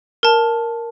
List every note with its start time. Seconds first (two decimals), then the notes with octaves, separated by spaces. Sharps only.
0.23 A#4 A5